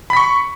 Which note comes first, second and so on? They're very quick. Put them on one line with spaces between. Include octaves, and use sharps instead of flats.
B5 B6 C#6